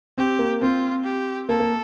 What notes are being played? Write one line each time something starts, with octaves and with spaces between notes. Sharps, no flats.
C4 G4
A#3
C4 F4
G4
A#3 A4
A#3